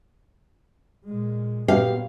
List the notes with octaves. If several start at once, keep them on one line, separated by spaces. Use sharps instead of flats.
A#2 G#3
A#2 F#3 B3 G4 F5